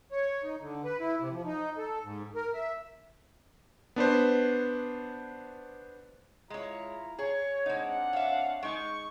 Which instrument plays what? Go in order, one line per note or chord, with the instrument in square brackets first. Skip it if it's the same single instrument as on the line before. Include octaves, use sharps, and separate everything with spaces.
[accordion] C#5
D#4
D3
B4
E4
C3
F3
D#4
A4
G#2
A#4
E5
[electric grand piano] B3 D4 B4 C5
[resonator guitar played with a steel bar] G#3 C#5 [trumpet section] E4 F4 A#5
[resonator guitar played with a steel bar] G#4 [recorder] C#5
[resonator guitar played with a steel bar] G#3 D#4 [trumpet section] C4 D4 F#5
[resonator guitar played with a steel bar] C#5 E5 [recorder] F5
[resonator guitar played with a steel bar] G#3 D#4 [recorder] C#6